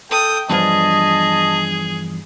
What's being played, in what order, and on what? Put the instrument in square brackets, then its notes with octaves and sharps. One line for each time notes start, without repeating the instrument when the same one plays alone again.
[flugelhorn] A4 [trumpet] G5 [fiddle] D#6
[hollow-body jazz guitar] E2 G2 F3 [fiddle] G#4 [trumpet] D#5 [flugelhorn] A5